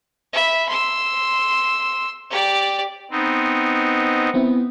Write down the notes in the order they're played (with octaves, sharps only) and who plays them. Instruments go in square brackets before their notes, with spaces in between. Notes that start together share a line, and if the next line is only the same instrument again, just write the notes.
[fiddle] E5 B5
C6 E6
G4 D5
[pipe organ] B3 C4 D#4
[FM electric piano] B3 C4 E4